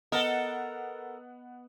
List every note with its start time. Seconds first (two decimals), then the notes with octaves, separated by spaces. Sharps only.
0.12 B3 A4 A#4 D#5 F#5